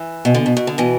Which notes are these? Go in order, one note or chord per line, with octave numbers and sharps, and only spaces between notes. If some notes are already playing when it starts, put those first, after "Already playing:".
Already playing: E3
B2
D3
B2
B2
D3
B2 E3